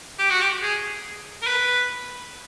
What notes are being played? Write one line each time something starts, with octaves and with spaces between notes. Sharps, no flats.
G4
F#4
G4
G#4
A#4
B4